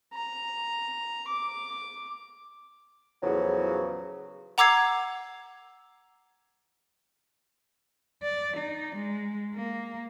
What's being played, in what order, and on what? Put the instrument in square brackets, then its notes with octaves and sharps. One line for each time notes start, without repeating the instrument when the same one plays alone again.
[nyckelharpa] A#5
D6
[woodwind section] E2 A2 C#3 F3 F#3
[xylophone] F#5 A#5 D6 E6 G#6 C7
[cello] D5
D#4
G#3
A#3